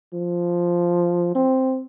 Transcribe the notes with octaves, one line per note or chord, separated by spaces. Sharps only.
F3
C4